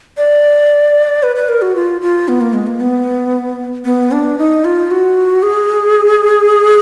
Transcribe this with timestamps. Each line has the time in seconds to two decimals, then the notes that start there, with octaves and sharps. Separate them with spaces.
0.17 D5
1.23 B4
1.36 B4
1.49 A#4
1.62 F#4
1.75 F4
2.01 F4
2.28 B3
2.41 A#3
2.53 G#3
2.67 A#3
2.80 B3
3.85 B3
4.12 D4
4.38 D#4
4.65 F4
4.91 F#4
5.43 G#4